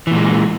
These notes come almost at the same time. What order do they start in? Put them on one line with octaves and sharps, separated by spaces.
E3 A#2 G#3